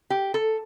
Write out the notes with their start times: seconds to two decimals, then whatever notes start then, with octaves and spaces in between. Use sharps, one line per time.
0.10 G4
0.34 A4